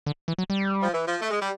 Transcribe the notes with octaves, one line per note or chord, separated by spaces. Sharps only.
D3
E3
F#3
G3
F3
E3
F3
A3
G#3
G3